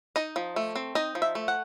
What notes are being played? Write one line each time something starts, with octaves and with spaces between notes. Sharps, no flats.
D#4 D#5
F3
A3
C4
D#4 D#5
F3
E5
A3
F#5